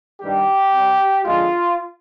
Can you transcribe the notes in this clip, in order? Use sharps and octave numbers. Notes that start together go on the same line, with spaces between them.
G2 D#3 G3 G4
C3 G3
F2 D3 G#3 F4